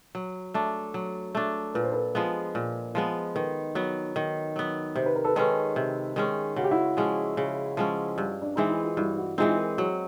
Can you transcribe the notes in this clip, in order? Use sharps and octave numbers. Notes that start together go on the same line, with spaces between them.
F#3
A3 D4
F#3
A3 D4
A#2 B4
C5
A4 B4
F3 G#3 B3
A#2
F3 G#3 B3
D#3 A4 B4
F#3 B3
D#3
F#3 B3
C3 C5
B4
A#4
A4 B4
D#3 G#3 C#4 A4 B4
C3
D#3 G#3 C#4
C#3 F#4
G4
E4 F#4
F3 G#3 C#4
C#3
F3 G#3 C#4
G2
D4
E3 G#3 C4 D#4
E4
F4
G2 E4 F#4
E4 F#4
E3 G#3 C4 D#4 F4
G#4 A#4
F#3 F#4 G#4